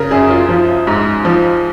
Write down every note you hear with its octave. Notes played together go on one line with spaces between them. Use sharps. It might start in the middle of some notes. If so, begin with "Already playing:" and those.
Already playing: C#3 A#4
F#2 G#4
F4
F3
G#2
F3